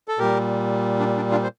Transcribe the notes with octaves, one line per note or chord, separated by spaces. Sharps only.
A4
A#2 G3 G4 A#4
D4
D4
D4 F4
C5